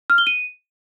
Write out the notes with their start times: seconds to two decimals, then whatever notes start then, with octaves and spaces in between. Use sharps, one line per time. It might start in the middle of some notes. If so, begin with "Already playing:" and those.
0.10 F6
0.18 G7
0.27 D#7